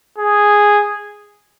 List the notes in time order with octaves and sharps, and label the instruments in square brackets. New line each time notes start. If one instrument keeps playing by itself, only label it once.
[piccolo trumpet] G#4